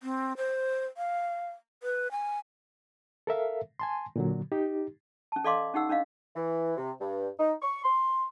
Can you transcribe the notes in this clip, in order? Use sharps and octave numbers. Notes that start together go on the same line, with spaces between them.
C4
C5
F5
B4
G#5
A4 A#4 E5 F5
G#5 A5 C6
A#2 D3 F#3
D#4 G4
C#4 A5
A4 D5 D#5 F5 C6 D6
C#4 D#4 G4 F#5 E6
C#4 D4 D#5 F5
E3
C3
G2
D#4
C#6
C6